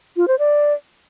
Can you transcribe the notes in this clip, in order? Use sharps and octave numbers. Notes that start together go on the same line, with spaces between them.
F4
C5
D5